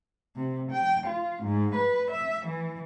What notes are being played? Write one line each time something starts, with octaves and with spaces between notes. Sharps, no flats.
C3
G5
F4
G#2
B4
E5
E3